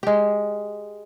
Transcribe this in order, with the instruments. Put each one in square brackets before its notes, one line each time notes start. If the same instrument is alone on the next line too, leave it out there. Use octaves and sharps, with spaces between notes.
[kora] G#3 G4